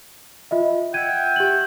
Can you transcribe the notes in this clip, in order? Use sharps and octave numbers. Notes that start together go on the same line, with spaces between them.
F4 D#5 E5
E5 F#5 G5 G#6 D#7
G4 F#7